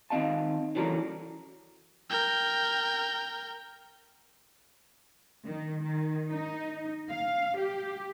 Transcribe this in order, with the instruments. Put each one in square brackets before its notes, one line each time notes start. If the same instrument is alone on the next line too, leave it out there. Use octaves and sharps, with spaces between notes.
[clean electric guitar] D#3 G#3 C4 D#5 F5 A5
C#3 E3 F#3 G3 A4 A#4
[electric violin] A#4 G5
[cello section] D#3
D#3
D#4
F5
G4